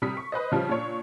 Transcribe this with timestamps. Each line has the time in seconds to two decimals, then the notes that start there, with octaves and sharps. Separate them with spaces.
0.02 C3 G3 B5 D#6 B6
0.17 C#6
0.32 B4 C5 D#5
0.52 C#3 F3 G3
0.69 A#2 D4 C#5 C#6